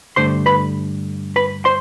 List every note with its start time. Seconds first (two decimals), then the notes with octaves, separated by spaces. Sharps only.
0.16 G2 D3 A3 C5 C6
0.46 B4 B5
1.36 B4 B5
1.65 C5 C6